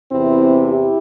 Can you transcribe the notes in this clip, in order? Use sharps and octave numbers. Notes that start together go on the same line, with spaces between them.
E2 C3 E3 C4 E4
E4 G4